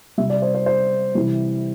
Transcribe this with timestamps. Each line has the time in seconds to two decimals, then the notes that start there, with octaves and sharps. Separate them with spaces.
0.18 C3 G3 E5
0.30 D5
0.42 C5
0.55 C5
0.66 C5
1.15 C3 E3 G3